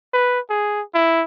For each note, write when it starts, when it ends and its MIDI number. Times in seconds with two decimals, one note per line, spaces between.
0.14 0.40 71
0.49 0.82 68
0.94 1.24 64